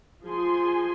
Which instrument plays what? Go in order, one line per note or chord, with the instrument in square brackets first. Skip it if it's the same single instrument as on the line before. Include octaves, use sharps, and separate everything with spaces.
[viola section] F3 G#4 G#5 C6